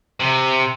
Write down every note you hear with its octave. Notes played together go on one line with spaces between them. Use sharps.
C3